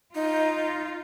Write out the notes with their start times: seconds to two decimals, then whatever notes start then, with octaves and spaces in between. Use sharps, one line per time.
0.15 D#4 F4